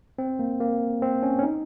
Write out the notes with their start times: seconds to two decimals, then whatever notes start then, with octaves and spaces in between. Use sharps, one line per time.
0.19 C4
0.39 A#3
0.60 A#3
1.02 C4
1.23 C#4
1.39 C#4
1.43 D#4